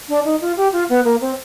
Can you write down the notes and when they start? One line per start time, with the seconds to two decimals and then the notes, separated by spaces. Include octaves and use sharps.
0.09 D4
0.25 D#4
0.41 F4
0.57 G4
0.73 F4
0.89 B3
1.05 A#3
1.21 C4